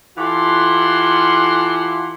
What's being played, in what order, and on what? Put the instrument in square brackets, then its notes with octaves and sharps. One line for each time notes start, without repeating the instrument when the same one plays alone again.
[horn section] E3 F4 G4 A4 F#5 C6